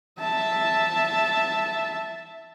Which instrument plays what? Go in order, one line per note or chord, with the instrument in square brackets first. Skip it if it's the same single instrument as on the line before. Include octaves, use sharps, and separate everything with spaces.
[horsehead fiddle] E5 A5